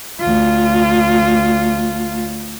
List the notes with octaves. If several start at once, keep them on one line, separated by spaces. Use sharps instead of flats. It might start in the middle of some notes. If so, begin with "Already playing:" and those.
D2 F4